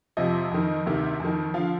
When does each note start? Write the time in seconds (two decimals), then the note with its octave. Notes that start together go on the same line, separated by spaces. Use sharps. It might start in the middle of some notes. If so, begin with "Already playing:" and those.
0.17 F2 C3 F3 D#5
0.51 F2 D#3
0.86 D2 C3 D#3
1.20 F2 D#3
1.54 D3 F3 F5